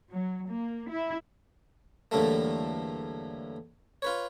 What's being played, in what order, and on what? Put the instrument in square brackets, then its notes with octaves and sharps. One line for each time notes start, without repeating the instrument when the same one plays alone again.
[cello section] F#3
A#3
E4
[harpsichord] E2 A2 D3 G3 A3 A#3
F4 B4 C#5